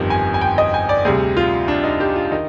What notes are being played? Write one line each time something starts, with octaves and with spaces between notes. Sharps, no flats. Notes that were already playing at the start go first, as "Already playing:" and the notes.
Already playing: G1 F2 D#3 G3
G#5
G#5
G5
D#5
G#5
D5
D2 C3 G3 G#4
F4
D4
D#4
G4
F4
D#3 D#4